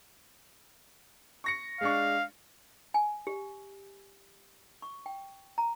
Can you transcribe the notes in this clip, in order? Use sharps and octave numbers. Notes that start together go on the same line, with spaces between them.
C#6 A#6 C#7
G#3 D4 F5 C#6
G#5
G4
C#6
G5
A#5